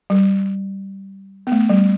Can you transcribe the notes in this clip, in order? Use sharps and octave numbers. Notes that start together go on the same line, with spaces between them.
G3
B3
A3
G3